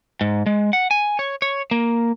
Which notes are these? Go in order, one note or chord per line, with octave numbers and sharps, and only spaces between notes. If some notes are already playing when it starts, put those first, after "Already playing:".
G#2
G#3
F#5
G#5
C#5
C#5
A#3